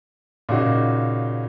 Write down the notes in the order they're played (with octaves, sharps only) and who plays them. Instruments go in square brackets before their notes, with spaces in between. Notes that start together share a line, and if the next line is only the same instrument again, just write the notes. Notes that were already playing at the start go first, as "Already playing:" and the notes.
[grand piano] A#2 C#3 D#4 F#4